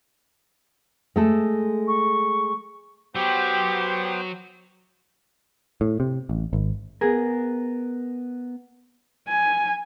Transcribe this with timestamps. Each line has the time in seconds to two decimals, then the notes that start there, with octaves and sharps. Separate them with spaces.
1.16 G#3 A3 A4
1.88 C#6
3.15 F#3 B3 G4 C5 G5
5.81 A2
6.00 C3
6.29 A1
6.53 G#1
7.01 B3 G#4 A#4
9.28 G#5